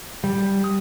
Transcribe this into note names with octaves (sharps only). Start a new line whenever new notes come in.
G3
D#6